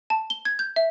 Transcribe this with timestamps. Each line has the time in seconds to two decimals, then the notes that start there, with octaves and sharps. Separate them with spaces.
0.10 A5
0.30 G7
0.45 G#6
0.59 G6
0.76 E5